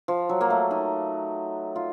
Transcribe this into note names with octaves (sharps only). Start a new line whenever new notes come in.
F3
F#3
A#3
A3
D#4
F4